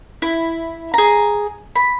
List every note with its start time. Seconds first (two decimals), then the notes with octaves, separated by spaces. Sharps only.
0.22 E4
0.94 G#4 A#5
1.76 B5